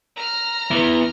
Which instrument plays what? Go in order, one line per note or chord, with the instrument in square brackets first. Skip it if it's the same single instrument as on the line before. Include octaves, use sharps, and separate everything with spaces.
[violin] A#5 F6
[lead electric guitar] B3 E4